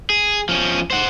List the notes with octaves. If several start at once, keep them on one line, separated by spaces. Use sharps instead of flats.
G#4
F3 C#4
C5 F#5